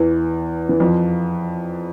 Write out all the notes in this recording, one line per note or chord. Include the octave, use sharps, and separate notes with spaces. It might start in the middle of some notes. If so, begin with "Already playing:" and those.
Already playing: E2 E3
E3
F2 F3